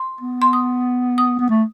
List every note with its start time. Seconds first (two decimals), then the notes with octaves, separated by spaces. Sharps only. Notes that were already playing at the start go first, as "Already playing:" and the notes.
Already playing: C6
0.21 B3
0.42 C6
0.53 D#6
1.18 D#6
1.39 B3
1.49 A3